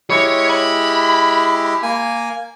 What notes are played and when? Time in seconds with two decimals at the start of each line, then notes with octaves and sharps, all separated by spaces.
0.10 G#3 E4 G4 C#5
0.49 B5
1.83 A#3 G#5